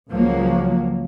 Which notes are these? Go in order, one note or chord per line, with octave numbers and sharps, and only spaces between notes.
C#2 F3 F#3 A#3